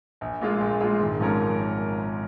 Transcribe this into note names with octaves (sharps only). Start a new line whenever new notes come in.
A#1
A#2 G#3 F4
A#1
A#2 G#3 F4
G#1
G#2 F3 C#4 A#4